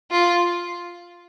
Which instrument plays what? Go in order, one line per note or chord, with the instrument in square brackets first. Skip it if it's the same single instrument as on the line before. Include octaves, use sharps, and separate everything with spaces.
[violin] F4